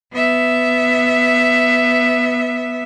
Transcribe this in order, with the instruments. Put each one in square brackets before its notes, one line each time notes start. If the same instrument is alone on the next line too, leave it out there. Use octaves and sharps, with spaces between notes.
[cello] B3 E5